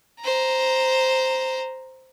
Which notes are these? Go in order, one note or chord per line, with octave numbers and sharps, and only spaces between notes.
C5 A#5